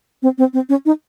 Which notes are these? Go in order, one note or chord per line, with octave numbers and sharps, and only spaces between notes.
C4
C4
C4
C#4
D#4